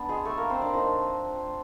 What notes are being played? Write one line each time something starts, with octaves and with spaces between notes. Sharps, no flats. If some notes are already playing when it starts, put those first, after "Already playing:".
Already playing: B3 D4
G#3 G#4
A3 A4
A#3 A#4
C4 C5
D4 D5
F3 A3 D4 D#4 D#5